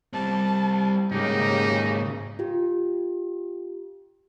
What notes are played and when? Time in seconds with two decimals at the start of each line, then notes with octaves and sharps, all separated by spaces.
0.13 G3 C4 A5
1.12 G#2 C#3 A#3 D#4 G4
2.39 F4 G4